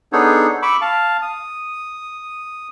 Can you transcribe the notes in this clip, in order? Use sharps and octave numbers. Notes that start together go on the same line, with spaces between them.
B3 D4 D#4 G#4 A4 C#5
B5 C#6 D6 E6
F5 A5
D#6